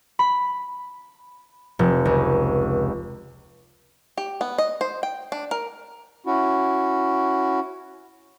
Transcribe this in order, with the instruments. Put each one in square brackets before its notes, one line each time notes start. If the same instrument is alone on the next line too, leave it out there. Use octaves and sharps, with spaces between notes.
[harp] B5
F1
C#2
[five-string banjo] G4
B3
D#5
C5
G5
D4
A#4
[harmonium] C#4 E4 F#4